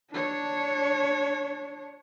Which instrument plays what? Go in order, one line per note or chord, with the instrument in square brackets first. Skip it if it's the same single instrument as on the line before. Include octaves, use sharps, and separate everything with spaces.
[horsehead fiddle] D4 C#5